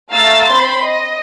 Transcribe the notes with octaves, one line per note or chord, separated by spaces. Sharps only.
A3 F5 A#5 E6 A6
C4 C5 B5 C6
D#5